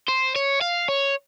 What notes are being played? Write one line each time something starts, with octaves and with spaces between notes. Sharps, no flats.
C5
C#5
F5
C#5